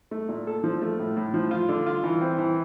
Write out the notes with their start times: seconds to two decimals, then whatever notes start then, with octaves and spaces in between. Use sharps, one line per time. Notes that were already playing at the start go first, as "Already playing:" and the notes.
0.11 A3
0.28 A#2
0.47 A4
0.64 F3
0.82 A3
0.99 A2
1.17 A2
1.34 F3
1.51 F4
1.69 D3
1.86 F4
2.04 E3
2.21 C4
2.39 E3